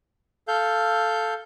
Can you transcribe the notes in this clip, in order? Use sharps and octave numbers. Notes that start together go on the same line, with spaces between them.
A4 F5 G6